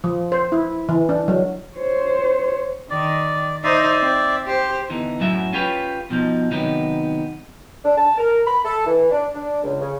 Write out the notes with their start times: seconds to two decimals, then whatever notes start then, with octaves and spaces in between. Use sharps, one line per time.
0.04 F3
0.32 C5
0.52 E4
0.89 E3
1.09 D4
1.28 F#3
1.77 C5 C#5
2.90 D#3 D5
3.64 D#4 C5 D5 E5
4.01 C4
4.46 G4 C5
4.89 E2 D3 E3 D#4
5.20 F#2 A2 F#3 F#4 E5
5.53 C#4 F4 G4 B4 C#5
6.10 B2 F3 D#4
6.51 C3 D#3 F#3 B3 D#4
7.85 D4
7.98 A5
8.18 A#4
8.47 B5
8.65 A4
8.86 E3
9.12 D4
9.35 D4
9.64 C#2
9.81 C#3